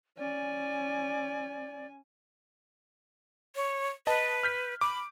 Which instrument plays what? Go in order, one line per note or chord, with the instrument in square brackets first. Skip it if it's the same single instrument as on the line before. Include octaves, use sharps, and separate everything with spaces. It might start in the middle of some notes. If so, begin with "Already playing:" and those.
[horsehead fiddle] C#4 G#5 [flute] D5
[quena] C#5
[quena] B4 [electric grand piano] D#5 A5
[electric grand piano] F6 G6 B6
[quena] B5 [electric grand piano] D6